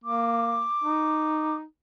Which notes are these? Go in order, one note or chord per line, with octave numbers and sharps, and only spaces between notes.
A#3 D6
D#4